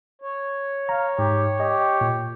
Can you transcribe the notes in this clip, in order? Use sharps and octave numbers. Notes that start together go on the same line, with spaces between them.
C#5
F5 A#5
G#2 G4
G4 D#5
A#2